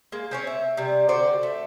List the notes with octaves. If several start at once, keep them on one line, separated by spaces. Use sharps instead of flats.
G#3 A#3
C4 C#4 C#5
E5
C3 G3
D3 F#4 C5 D5
A3